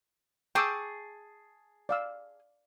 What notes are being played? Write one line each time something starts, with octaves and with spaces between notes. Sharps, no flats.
G#4 G5 A5 C#6 D6 E6
D5 F5 E6